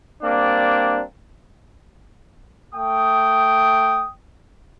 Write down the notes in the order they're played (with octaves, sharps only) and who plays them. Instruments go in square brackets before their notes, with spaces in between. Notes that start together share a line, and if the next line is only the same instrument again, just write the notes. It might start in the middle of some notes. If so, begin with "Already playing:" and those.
[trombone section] G3 A#3 C4 D4
[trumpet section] A3 G5 D#6